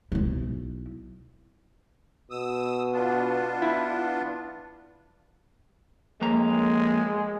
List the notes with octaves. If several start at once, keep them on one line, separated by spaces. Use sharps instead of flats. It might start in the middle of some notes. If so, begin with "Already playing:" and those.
B1 E4
B2 D#6 E6
B3 D4 F4
E4
F2 G#3 A#3 A#5